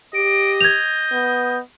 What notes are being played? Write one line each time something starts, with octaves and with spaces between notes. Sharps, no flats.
G4 D#5 D7
G6 G#6 F7
B3